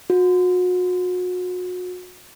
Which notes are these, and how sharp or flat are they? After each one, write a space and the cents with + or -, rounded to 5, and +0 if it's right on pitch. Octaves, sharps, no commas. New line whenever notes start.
F#4 -35